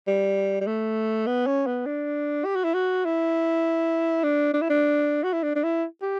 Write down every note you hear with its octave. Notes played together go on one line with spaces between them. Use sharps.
G3
G3
A3
B3
C#4
B3
D4
G4
F#4
E4
F#4
E4
D4
D4
E4
D4
F#4
E4
D4
D4
E4
G4